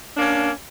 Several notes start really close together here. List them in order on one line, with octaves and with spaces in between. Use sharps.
D4 A#3 C#4